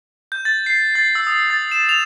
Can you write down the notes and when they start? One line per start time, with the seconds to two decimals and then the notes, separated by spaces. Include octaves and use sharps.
0.32 G6
0.45 A6
0.66 C7
0.95 A6
1.15 E6
1.27 D#6
1.50 A6
1.72 E7
1.89 F7